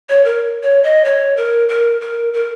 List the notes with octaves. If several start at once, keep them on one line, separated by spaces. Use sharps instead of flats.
C#5
A#4
C#5
D#5
C#5
A#4
A#4
A#4
A#4